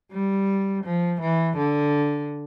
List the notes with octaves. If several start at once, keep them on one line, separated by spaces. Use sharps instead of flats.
G3
F3
E3
D3